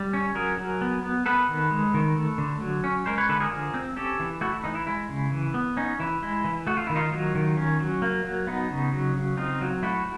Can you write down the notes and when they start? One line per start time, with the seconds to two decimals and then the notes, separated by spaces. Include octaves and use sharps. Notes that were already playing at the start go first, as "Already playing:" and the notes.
Already playing: G3
0.13 C#4
0.35 F#3 G#4 A#4
0.58 F#3
0.81 B3
1.03 B3
1.26 B3 A4 B4
1.49 D#3
1.71 G#3
1.94 D#3
2.16 A3
2.38 D3
2.61 F#3
2.84 C#4
3.06 G#3 A#4 C5
3.18 B4 C#5
3.29 D3 A4 B4
3.40 G#4 A#4
3.51 F3
3.74 C4
3.96 C#4 G4 A4
4.20 E3
4.41 A3 E4 F#4
4.53 E4
4.64 E3 D#4
4.75 E4
4.87 G#3 E4
5.09 C#3
5.31 E3
5.54 B3
5.77 C#4 D#4
6.00 E3 E4
6.22 G#3 E4
6.45 E3
6.67 A3 F#4
6.77 F4
6.87 D#3 E4
6.96 D#4 F4
7.12 F#3
7.35 D#3
7.57 C#4
7.80 F#3
8.02 A#3
8.25 F#3
8.47 B3 D#4
8.70 C#3
8.92 F#3
9.15 C#3
9.37 C4 D#4 F4
9.61 F#3
9.83 A3 E4 F#4